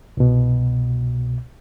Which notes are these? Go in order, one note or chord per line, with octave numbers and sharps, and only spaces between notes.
C2 B2